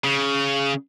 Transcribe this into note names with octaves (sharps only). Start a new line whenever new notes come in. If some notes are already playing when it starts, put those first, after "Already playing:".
C#3